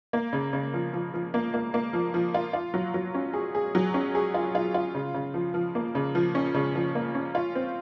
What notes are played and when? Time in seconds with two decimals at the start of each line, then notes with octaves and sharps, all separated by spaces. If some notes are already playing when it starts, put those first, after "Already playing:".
0.13 A#3
0.33 C#3
0.53 C#3
0.74 F3
0.93 F3
1.14 F3
1.34 A#3
1.54 A#3
1.74 A#3
1.93 F3
2.14 F3
2.34 F4
2.53 F4
2.74 F#3
2.94 F#3
3.14 C#4
3.33 G#4
3.55 G#4
3.75 F#3
3.94 C#4
4.15 G#4
4.34 F4
4.55 F4
4.74 F4
4.95 C#3
5.14 C#3
5.34 F3
5.54 F3
5.75 A#3
5.95 C#3
6.15 F3
6.35 C#4
6.55 C#3
6.75 F3
6.95 A#3
7.15 C#4
7.35 F4
7.55 C4